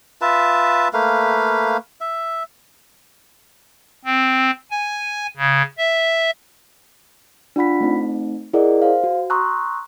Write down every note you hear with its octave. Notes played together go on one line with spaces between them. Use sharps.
F4 B4 E5 A5
A3 A#3 B4 F5
E5
C4
G#5
C#3
E5
D4 F4 F#5 B5 B6
A3 C4 D#4
E4 G#4 A#4 D5 D#5 F#5
C5 F5
F#4
A#5 C6 C#6 D#6 E6 F#6